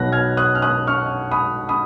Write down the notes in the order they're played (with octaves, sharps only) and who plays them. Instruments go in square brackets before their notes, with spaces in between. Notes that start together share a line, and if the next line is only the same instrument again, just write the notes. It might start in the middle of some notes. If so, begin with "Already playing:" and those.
Already playing: [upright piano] B1 B2 F#3 B3 F#6 A#6
F6 G#6
D#6 F#6
F6
D#6 F#6
C#6 F6
B5 D#6
B5 D#6